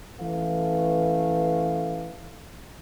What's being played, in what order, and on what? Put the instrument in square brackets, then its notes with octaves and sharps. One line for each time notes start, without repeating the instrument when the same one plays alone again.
[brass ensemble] E3 A3 C#4 B4 F5